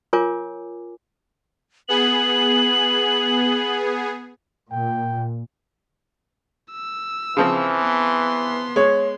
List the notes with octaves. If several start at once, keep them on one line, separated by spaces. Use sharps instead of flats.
F4 A#4 C#5 G#5 D6
B3 G#4 F#7
A#2 G5
E6
C#3 E3 F3 C4
B3 C6
G#3 C#5